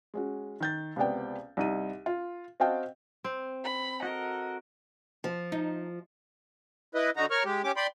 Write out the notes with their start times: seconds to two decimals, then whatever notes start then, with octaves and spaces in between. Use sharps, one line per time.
0.14 G#3 C#4 F#4
0.60 D#3 G6 A6
0.96 C#2 C3 B3 D5 G5
1.57 C2 D#4 D#7
2.06 F4
2.60 C4 F#4 D#5 F5 G5 A5
3.24 C4
3.65 B5
4.03 F#4 A4 A#4 D#5
5.24 F3
5.52 D#4
6.95 E4 B4 D#5
7.17 D3 D#4 F#4 A#5
7.31 A#4 C#5 C#6 F6
7.45 G#3 G4
7.64 C#4 G4 D6
7.77 D5 G5 B5 C6